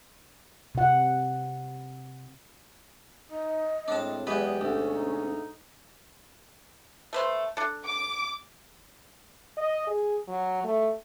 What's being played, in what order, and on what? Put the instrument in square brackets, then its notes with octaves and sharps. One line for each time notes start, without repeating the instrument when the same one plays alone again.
[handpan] C3 F#5
[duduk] D#4 [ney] D#5
[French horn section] A2 G#3 C#5 [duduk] C4 [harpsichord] D4 A5
[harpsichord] E2 G#3 B4 [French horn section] F#3 D5 [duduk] G4 [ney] G#4
[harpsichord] D2 [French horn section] G#2 B2 D4 [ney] C#4
[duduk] D#4
[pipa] A3 B4 C5
D4 A4
[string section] D6
[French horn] D#5
G#4
F#3
A3